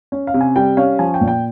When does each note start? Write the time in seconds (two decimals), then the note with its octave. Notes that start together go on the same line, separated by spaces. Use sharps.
0.12 C#4
0.27 F5
0.34 C3
0.41 G#5
0.56 G3 G5
0.77 C#4 F5
0.99 F3 G#5
1.14 G5
1.21 A#2
1.28 G5